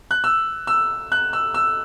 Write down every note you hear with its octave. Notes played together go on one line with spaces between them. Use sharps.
F#6
E6
E6
F#6
E6
E6